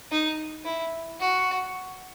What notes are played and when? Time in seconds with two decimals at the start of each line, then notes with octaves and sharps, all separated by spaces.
0.11 D#4
0.65 E4
1.20 F#4